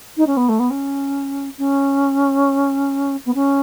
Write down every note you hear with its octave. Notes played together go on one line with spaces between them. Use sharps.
D#4
C#4
B3
A3
B3
C#4
C#4
B3
C#4